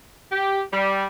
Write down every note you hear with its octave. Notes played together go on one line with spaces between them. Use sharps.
G4
G3